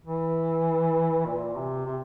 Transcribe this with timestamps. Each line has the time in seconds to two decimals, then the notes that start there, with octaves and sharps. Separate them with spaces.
0.06 E3
1.25 A#2
1.56 C3
1.86 C3